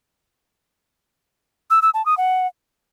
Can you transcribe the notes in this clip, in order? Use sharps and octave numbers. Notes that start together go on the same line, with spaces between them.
E6
E6
A5
D#6
F#5